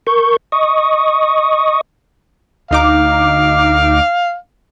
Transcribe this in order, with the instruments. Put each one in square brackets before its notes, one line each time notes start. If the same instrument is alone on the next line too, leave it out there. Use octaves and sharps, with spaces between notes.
[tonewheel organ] A#4 C#6 G6
D#5 C#6 D#6
[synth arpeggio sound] D2 D#4 D6 [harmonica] F5